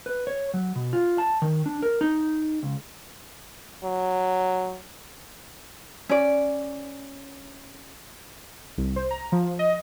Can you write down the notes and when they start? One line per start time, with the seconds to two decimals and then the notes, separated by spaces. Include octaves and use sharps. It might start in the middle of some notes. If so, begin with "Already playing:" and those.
0.06 B4
0.27 C#5
0.54 F#3
0.76 B2
0.93 F4
1.18 A5
1.42 D#3
1.66 D4
1.82 A#4
2.01 D#4
2.63 C#2
3.84 F#3
6.09 C#4 D5
8.78 C2
8.96 C5
9.11 A#5
9.32 F3
9.59 D#5